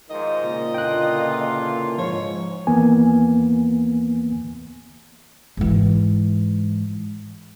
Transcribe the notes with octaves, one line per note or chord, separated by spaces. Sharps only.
G#2 D#3 F3 D#5
A#2 C#3
D3 E3 F4 G5 F#6
G#2 F3 C#5
D#2 E3 A#3 B3 G#5
G#2 E3